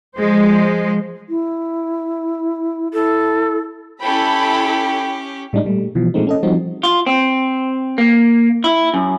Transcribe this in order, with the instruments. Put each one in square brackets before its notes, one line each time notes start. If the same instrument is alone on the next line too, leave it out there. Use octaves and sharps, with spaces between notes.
[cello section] F3 G#3 C5
[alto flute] E4
[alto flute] E4 [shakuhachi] A4
[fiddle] C#4 G4 [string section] E4 A4 B5 [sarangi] G5
[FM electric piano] A2 G3 G#3 D4 D#4
A#2 G3 A3
B2 E3 F3
A#2 G#3 A3 C4 D#4
C#4 A4 D#5
F3 G3 C4 D#4 F#4
[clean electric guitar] F4
C4
A#3
E4
F#2